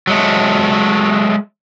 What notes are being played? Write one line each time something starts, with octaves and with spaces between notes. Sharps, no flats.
F#3 G#3 A3